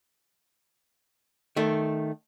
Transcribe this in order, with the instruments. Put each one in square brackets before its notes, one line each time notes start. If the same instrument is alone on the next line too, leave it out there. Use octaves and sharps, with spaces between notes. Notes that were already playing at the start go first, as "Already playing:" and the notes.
[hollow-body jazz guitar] D#3 A3